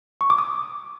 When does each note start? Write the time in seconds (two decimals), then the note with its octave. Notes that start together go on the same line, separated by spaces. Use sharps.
0.21 C#6
0.30 D6
0.38 D#6